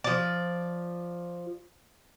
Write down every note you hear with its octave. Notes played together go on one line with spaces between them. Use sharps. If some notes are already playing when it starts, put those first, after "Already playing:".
F3 D5